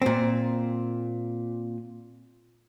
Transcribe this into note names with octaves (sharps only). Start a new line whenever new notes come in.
A#2 C4